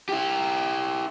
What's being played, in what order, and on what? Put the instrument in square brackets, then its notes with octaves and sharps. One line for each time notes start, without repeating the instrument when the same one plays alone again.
[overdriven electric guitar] E4 G4